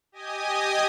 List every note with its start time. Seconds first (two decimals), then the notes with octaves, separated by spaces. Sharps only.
0.12 G4 D#5 G#5 D#6